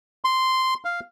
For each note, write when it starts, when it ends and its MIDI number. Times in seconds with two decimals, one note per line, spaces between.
0.24 0.74 84
0.85 1.00 77